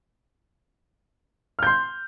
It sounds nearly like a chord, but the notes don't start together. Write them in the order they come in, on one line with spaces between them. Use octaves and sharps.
F6 G6 C6